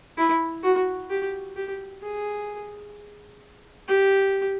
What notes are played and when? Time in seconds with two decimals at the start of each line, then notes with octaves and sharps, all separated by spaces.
0.17 E4
0.63 F#4
1.10 G4
1.56 G4
2.03 G#4
3.88 G4